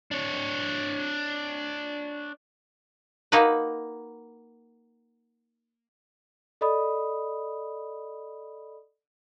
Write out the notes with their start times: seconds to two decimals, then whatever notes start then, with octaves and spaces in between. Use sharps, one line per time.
0.11 D4 C#5
3.32 A#3 D#4 F#4 B4
6.61 A4 D5 D#5 B5 D#6